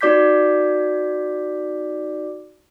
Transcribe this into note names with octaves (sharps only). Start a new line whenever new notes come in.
D#4 F#4 D5 D6 G6 B6